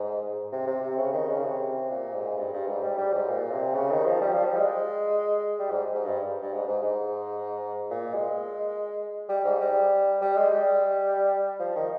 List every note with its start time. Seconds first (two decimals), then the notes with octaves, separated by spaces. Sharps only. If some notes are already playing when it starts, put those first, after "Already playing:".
Already playing: G#2
0.52 C3
0.67 C3
0.83 C3
0.98 C#3
1.13 D#3
1.29 C#3
1.45 C3
1.91 A#2
2.14 G#2
2.37 G2
2.53 G2
2.67 G#2
2.83 G3
2.98 G3
3.13 G#2
3.29 A#2
3.52 C3
3.75 C#3
3.91 D#3
4.06 F3
4.21 G3
4.33 F3
4.45 G3
4.56 G#3
5.59 G3
5.71 G#2
5.95 G#2
6.06 G2
6.42 G2
6.53 G#2
6.67 G#2
6.83 G#2
7.90 A#2
8.14 G#3
9.29 G3
9.44 G#2
9.60 G3
10.21 G3
10.37 G#3
10.52 G3
11.60 F3
11.76 D#3